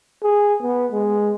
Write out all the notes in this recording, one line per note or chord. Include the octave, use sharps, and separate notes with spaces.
G#4
B3
G#3